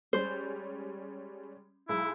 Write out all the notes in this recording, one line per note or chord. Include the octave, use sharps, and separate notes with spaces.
G3 G#3 C#4 C5
B1 G#3 E4